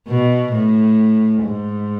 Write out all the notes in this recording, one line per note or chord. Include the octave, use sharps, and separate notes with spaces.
B2
A2
G#2